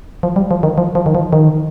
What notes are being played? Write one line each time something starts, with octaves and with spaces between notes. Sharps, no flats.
F3
G3
F3
D#3
F3
F3
D#3
F3
D#3